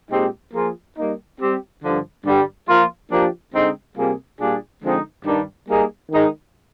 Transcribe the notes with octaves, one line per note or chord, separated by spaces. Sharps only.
A#2 G#3 C4 D#4 G4
F3 A#3 F4 G#4
G3 A#3 D#4
G3 C4 G4
G2 D3 F3
G2 D3 G3
F3 A#3 F4
F3 A#3 D4 G4
D3 G#3 C4 D#4
C3 G3 A#3 F4 G#4
A#2 G3 D4 F4 G#4
D3 F3 G#3 C4 D#4
G2 D#3 G3 D4
G3 A#3 D#4 G#4
D#3 G#3 D#4